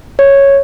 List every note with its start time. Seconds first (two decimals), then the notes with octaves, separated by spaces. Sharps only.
0.19 C#5